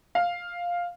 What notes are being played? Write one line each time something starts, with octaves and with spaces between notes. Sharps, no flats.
F5